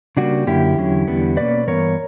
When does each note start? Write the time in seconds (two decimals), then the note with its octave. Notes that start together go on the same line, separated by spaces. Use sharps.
0.17 C#3 G3 A#3 D4 F#4
0.47 F#2 D3 A#3 C#4 E4 G4
0.77 E2 D3 F#3 C#4
1.07 E2 D3 G3 B3
1.37 B2 A#3 C#4 B4 D5
1.67 G2 E3 B3 A#4 C#5